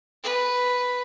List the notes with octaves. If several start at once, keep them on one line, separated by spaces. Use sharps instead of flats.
B4